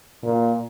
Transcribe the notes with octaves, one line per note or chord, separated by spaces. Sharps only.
A#2